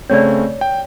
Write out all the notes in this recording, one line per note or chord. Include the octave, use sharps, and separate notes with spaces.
C#3 A3 C4 C#5 D5
G5